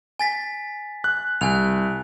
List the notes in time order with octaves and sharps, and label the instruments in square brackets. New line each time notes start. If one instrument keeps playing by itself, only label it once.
[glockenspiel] G#5 A6 B6
[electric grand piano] F#6
[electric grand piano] C2 [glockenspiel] G#5 F#6 F7